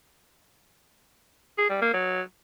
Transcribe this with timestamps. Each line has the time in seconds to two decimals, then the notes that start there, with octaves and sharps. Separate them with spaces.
1.58 G#4
1.70 G3
1.82 A#3
1.94 F#3